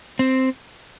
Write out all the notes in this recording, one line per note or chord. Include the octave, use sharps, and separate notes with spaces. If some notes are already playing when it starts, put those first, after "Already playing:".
C4